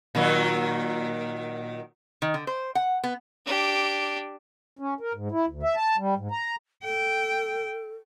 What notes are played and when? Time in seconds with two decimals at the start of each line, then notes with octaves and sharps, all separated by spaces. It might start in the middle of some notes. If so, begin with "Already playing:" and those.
0.15 A#2 D#3 F#3
2.22 D#3
2.34 D3
2.47 C5
2.75 F#5
3.04 B3
3.46 D4 G4
4.79 C#4
5.01 A#4
5.14 G#2
5.31 E4
5.47 D2
5.63 E5
5.76 A5
5.98 G3
6.17 G#2
6.31 A#5
6.84 A4 G5